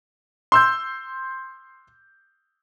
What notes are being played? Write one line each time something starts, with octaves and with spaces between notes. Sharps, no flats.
C6 E6 G6